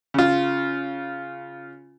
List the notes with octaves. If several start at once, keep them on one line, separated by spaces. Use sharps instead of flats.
C#3 F4